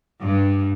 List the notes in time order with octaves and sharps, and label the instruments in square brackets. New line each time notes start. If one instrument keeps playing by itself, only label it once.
[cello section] G2